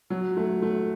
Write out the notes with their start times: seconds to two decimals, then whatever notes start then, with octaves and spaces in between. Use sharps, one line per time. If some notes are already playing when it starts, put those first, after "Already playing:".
0.10 F#3
0.37 A3
0.62 A3